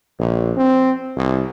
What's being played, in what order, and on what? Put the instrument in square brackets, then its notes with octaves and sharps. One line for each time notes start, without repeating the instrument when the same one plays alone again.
[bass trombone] A#1
C4
C2